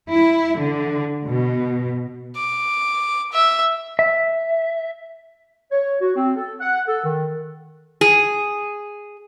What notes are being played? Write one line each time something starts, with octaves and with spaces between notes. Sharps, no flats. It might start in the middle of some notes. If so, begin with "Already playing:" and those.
E4
D3
B2
D6
E5
E5
C#5
F#4
C4
A4
F#5
A4
D#3
G#4